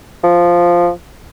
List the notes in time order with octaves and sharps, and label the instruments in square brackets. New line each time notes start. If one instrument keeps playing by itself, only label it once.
[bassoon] F3